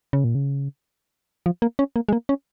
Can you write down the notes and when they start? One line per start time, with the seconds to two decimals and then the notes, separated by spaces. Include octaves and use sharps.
0.13 C#3
0.24 A#2
0.35 C#3
1.46 F3
1.62 A#3
1.79 C#4
1.96 A#3
2.09 G#3
2.13 A#3
2.29 C#4